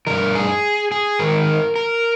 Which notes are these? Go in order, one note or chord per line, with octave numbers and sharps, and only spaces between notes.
G2 D#3 A#4
G#4
G#4
G#2 D#3 A#4
A#4